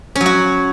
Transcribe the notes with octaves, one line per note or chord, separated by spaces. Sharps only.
C#4
F#3
F#4